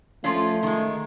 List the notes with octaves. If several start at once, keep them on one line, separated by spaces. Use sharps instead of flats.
F3 A3 C#4 F4
D#3 G#3